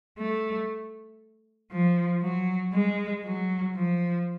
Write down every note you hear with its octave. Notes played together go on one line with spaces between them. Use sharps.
A3
F3
F#3
G#3
F#3
F3